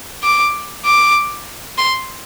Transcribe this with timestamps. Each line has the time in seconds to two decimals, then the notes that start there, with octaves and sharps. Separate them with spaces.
0.23 D6
0.85 D6
1.78 C6